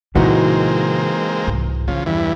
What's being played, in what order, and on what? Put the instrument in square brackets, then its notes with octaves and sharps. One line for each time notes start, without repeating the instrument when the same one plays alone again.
[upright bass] A#2 C#3 [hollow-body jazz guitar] E3 D#4 F#4 [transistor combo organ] G#3 A#3 C4
[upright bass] C2 G#2
[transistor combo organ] C#3 F3 [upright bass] C#4
[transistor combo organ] E2 G2 E3